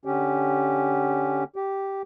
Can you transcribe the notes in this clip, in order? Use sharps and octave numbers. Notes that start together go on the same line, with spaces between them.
D3 C#4 G4
G4